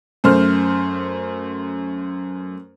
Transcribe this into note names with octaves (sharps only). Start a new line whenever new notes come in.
F#2 A3 C5 F6